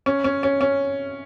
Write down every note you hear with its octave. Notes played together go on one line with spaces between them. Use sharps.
C#4
C#4
C#4
C#4